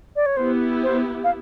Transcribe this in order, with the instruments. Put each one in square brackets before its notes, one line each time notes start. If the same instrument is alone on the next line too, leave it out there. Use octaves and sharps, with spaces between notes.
[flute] D5
C#5
[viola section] B3 E4 G4 [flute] C5
[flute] C5
F5